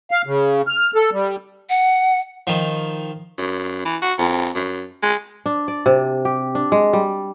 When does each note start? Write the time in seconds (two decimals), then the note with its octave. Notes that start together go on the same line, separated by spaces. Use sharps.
0.11 F5
0.26 C#3
0.67 F6
0.96 A4
1.12 G3
1.69 F#5
2.47 D#3 F3
3.38 F#2
3.85 E3
4.02 F#4
4.18 F2
4.55 F#2
5.02 G#3
5.46 D4
5.68 D5
5.86 C3
6.25 G4
6.55 D4
6.72 G#3
6.93 G3